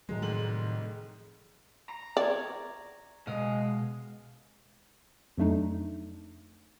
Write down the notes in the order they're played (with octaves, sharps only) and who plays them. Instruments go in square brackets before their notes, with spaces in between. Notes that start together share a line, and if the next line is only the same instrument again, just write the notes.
[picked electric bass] A2 D#3 F#3 [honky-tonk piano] G#3
[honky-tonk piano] F1 G#2 F#7
[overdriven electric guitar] A#5
[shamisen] D5 [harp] C#6 G#6
[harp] B2 D#5 F5 [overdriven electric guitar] G#3
[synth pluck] F2 F#3 A3 D4 D#4